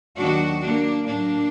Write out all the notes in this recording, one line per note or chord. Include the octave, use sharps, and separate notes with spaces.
D#2 D#3 F#3 D4 F#4
A#3 D4
A2 F#3 A#3 D4